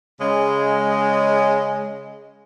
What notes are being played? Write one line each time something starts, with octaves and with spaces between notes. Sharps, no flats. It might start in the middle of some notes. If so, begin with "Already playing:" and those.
C#3 G#3